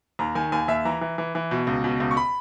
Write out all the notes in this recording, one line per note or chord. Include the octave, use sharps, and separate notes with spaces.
D#2 A#5
D#3 G#5
D#2 G#5
D#2 E5
E3 A#5
E3
E3
E3
B2
C#2
B2
C#2
C#6
B5